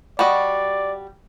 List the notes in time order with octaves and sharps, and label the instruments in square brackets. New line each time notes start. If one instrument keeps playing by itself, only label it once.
[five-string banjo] G3 F#4 D#5 [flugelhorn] D5